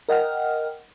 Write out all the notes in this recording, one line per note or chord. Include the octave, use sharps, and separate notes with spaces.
A#4 D#5 F#5 G5 F6